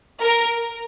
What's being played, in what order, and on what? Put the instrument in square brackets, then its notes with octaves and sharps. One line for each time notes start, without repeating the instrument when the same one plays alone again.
[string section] A#4